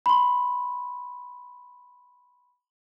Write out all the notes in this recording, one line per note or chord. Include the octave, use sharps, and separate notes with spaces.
B5 C6